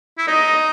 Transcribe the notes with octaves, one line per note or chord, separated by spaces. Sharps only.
E4
D#4 D#5